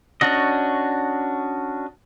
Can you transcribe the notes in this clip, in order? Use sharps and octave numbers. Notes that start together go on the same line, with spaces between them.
C#4 D4 F#4 D#5